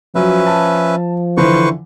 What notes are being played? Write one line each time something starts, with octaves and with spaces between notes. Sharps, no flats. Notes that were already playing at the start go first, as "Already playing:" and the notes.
F3 F#3 C#4 B4 E5
A5
D3 E3 B4 C5 C#6